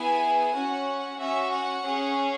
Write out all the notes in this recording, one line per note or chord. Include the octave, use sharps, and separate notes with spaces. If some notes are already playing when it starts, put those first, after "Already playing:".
Already playing: B3 E4 G#4 G#5
C#4 F#4 F#5
C#4 F#4 E5
F#5
C#4 G#4